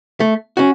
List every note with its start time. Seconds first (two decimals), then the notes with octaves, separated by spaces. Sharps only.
0.20 A3
0.57 C#4 F#4